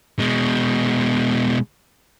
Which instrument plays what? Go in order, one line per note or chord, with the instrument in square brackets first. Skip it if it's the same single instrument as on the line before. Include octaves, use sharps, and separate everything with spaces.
[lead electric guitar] B2 G#3